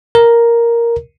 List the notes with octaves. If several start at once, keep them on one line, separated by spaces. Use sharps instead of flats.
A#4